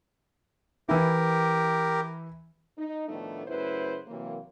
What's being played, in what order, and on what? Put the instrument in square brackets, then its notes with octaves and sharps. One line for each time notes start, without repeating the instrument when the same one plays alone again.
[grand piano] E3 E4 [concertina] G4 A#4
[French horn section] D#4
A2 D#3 F3 A3 B3 D4
F#2 C#3 A3 E4 B4 C5
C3 E3 F#3 A#3